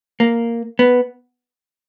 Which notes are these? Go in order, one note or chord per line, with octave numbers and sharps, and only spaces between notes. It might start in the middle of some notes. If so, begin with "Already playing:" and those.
A#3
B3